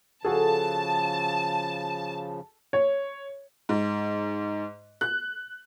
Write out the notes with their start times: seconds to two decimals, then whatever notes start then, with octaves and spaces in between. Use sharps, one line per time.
0.25 C#3 F3 F#4 G#4 A4 A5
2.73 C#5
3.69 G#2
5.01 F#6